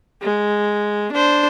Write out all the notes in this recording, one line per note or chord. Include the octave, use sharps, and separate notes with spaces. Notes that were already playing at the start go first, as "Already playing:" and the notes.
G#3
D4 C5